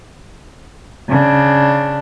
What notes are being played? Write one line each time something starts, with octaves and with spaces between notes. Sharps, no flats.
C#3 D4